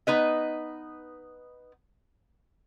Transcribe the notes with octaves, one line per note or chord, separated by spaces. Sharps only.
B3 D#4 B4 D#5